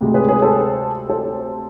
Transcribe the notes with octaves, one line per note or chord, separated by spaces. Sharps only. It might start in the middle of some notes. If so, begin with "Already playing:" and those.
D2 C3 G#3
G#4 B4
G#4 B4
A4 C5
A4 C5